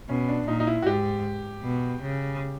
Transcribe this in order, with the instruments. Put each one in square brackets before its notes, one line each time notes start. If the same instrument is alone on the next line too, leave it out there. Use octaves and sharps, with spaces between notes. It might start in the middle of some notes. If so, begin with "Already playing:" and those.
[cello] B2 [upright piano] C#4
[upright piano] D4
[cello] A#2 [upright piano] D#4
[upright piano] D#4
E4
F#4
[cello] G#2 [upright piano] G4
[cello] B2
C#3